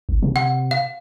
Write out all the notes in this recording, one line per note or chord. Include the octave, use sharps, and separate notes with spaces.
G#1
C3
F#5
F5